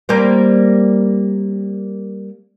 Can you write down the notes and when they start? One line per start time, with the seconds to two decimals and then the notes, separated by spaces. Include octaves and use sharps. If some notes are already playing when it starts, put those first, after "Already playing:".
0.09 G3 A#3 C4